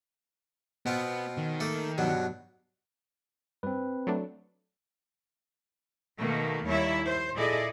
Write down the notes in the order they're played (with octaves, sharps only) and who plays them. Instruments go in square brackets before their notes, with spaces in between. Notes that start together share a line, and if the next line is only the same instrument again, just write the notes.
[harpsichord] B2 C4 F4 [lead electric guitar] B3
[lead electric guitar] D#3
[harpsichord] A3 A#3 A4
G2 B2 F#3
[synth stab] G2 [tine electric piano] C4 B4
[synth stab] F#3 A3 D4
[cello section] B2 D#3 A3 A#3
D#2 G3 E4 C#5 E5
C5
A#2 E4 G#4 A4 D5 D#5